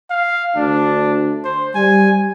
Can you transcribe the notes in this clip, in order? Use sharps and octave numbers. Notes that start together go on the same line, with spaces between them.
F5
D2 D4
C5
G3 G#5